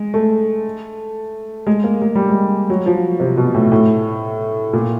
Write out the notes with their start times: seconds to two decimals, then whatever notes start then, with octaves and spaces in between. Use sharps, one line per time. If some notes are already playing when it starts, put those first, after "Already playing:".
Already playing: G#3
0.14 A3
1.67 G#3
1.84 A#3
2.02 G#3
2.15 G3
2.30 G#3
2.70 F#3
2.86 F3
3.20 C3
3.37 B2
3.54 A2
3.72 A2
4.73 A#2